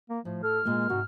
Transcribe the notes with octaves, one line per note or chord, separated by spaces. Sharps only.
A#3
A2 F3
A4 F6
A#2 G#3 A#3
G#2 C3 F#4